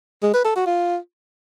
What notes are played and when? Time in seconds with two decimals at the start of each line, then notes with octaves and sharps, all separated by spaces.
0.23 G#3
0.34 B4
0.44 A4
0.55 F#4
0.66 F4